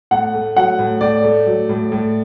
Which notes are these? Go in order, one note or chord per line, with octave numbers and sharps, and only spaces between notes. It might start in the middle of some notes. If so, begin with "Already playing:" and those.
A2 F#5
A3
F#3 F#5
A2
A2 D5
A3
F#3
A2
A2